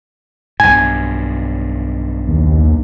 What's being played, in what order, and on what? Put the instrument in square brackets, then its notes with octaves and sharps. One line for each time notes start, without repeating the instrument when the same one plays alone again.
[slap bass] B1 G2 [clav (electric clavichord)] G#5
[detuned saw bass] D#2